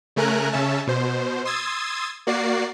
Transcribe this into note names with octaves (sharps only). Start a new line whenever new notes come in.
C#3 A3 A#4 G#5 A#5 F#6
C#3 C#4 E5 A5
B2 C5
C6 D#6 E6 G#6 A6
A#3 F#4 D5 C7